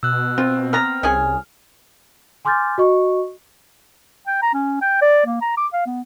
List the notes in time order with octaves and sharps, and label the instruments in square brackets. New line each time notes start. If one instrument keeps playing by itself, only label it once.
[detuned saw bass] B2 [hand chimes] E6 F#6
[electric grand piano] C4 [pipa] F4
[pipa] B3 A#5 [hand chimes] F6
[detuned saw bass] C2 [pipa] C#4 G#4 G#5
[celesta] G#5 C6 D6 F6 G6 A6
F#4 D#5 C#6
[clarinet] G5
A#5
C#4
G5
D5
A#3
A#5
D6
F5
B3